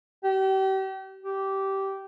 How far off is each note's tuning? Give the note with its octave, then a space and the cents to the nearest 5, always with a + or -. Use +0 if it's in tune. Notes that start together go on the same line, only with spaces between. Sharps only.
G4 -35
G4 -15